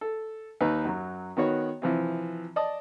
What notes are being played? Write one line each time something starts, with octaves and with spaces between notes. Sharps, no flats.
A4
D#2 D#4 B4
F#2 F#3
D#3 B3 F#4 C#5
C3 E3 F3
D5 D#5 A5 D#6